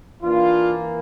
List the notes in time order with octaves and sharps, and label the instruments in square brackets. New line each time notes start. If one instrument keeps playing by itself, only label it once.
[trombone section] E3 A#3 D4 F4